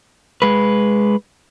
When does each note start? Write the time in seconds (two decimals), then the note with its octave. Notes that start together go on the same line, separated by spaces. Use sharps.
0.42 G#3 B4